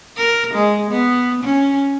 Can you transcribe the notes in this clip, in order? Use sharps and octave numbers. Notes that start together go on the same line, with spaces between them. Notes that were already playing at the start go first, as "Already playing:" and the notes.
A#4
G#3
B3
C#4